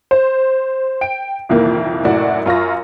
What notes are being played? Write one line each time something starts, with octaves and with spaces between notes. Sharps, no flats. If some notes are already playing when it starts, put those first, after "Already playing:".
C5
G5 D7
C2 F2 A#2 D#3 E3 A#3
F1 F#2 A2 F#4 D5
F#2 F4 C#6 A#6